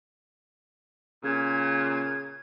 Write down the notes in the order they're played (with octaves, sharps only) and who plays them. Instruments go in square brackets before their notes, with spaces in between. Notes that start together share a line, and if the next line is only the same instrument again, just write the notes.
[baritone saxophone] A#2 [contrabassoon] C#3 [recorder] G#6